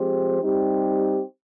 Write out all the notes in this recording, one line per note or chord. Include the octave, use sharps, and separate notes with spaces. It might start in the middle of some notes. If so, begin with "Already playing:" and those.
Already playing: F3 G#3 C4 G4 C5
G3 C4 D#4 G4